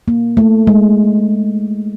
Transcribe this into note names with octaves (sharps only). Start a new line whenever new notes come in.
A#3
A3
G#3